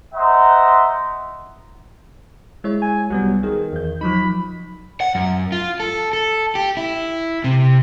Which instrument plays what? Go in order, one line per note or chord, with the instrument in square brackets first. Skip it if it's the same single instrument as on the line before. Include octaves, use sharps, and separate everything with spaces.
[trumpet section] C5 D#5 E5 F#5 A#5
[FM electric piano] G#3 E4 C#5
[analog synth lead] G#5
[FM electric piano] C2 G3 B3 [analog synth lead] F#3
[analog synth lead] D#3 [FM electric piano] G#4
[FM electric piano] E2 G6
[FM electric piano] F3 F#3 D#4 [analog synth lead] B5
[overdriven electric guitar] F#5
F#2
F4
A4
A4
G4
E4
C3